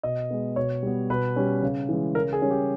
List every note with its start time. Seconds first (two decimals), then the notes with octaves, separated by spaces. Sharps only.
0.03 B2 D#5
0.30 G#3 B3
0.56 B2 C#5
0.83 G3 B3
1.10 B2 B4
1.36 G3 C#4
1.63 C#3
1.89 E3 G#3
2.15 C#3 A#4
2.33 G#4
2.42 G3 C#4
2.51 G4